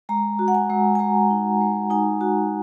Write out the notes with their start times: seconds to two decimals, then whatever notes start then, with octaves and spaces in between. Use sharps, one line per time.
0.09 G#3 A#5
0.39 F#4
0.48 F#5
0.55 G#5
0.70 G#3
0.95 G#5
0.99 G#3 A#5
1.30 D#4
1.61 G#3
1.90 D#4 G#5
2.21 F#4